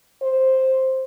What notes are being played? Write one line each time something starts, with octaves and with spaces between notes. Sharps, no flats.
C5